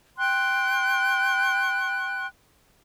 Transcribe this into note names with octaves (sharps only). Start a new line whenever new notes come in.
G5 C6 F#6